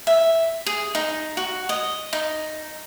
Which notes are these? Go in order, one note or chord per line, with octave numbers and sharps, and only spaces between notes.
E5
G#4
D#4
F#4
D#5
D#4